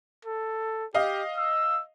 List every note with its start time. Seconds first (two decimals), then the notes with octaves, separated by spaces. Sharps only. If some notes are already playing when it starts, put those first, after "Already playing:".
0.25 A4
0.94 G4 D#5 F5
1.37 E6